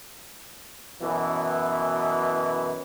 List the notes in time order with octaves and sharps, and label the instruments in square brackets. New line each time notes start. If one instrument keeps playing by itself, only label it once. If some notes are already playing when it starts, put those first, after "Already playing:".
[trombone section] F#2 B2 E3